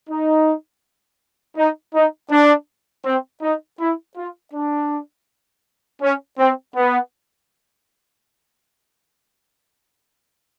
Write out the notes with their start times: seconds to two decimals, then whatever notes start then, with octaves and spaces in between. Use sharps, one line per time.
0.09 D#4
1.57 D#4
1.94 D#4
2.30 D4
3.05 C4
3.42 D#4
3.80 E4
4.17 F4
4.54 D4
6.02 C#4
6.39 C4
6.76 B3